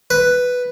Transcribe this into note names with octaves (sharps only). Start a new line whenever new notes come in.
B4